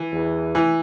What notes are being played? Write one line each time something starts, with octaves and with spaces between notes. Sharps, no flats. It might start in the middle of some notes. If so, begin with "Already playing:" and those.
Already playing: E3
E2
E3